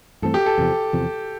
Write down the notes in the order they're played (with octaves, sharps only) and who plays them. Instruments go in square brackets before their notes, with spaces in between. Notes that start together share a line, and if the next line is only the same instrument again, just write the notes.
[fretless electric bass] G2 E3 A3 C4 [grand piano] A4
[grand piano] G4
A4
[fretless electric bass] E2 C3 F3
E2 C3 F3